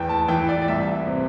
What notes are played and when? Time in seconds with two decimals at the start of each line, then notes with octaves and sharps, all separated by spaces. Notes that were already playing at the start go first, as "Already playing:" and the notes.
Already playing: E2 E3 G5
0.09 A5
0.28 E3 G5
0.49 D5
0.62 D5
0.68 C2 E5
1.07 C3